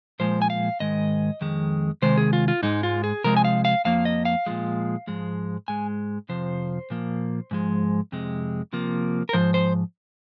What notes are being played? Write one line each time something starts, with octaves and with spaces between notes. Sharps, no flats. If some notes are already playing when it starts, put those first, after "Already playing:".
A#2 F3 G#3 C5
G#5
F5
G#2 D#3 G#3 D#5
F2 D#3 G#3
C3 D#3 G#3 C5
G#4
F4
F4
G#2 G#3 D#4
F4
G#4
C3 F3 G#3 A#4
G#5
F5
F5
F2 F3 A#3 F5
D#5
F5
A#2 F3 G#3
G#2 F3 G#3
G#2 G#3 G#5
F2 C3 F3 C5
A#2 F3 A#3
G#2 F3 G#3
F2 C3 G#3
C3 F3 A#3
A#4
G#2 F3 C5
C5